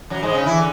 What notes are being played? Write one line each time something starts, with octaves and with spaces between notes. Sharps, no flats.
F#2 F#3
G#2 G#3
C#3 C#4
E3 E4
D3